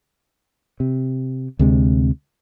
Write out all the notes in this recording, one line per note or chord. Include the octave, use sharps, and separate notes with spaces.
C3
D2 C3 G#3